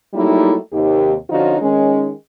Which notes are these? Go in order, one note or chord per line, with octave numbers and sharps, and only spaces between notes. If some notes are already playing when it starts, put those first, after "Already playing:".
F#3 G3 A3 A#3 D#4 E4
D#2 C3 G4
D3 F3 C#4 D#4 F4 F#4
D#3 G#3 C#4